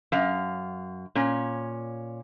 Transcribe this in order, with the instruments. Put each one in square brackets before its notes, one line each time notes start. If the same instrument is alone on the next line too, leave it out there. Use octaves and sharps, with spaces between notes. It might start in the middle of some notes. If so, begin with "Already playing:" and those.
[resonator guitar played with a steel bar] F#2 F5
A#2 C#4